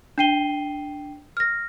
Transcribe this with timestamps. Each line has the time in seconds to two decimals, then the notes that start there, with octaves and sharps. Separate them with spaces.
0.18 D4 G5 C7 D#7 G7
1.37 F6 A#6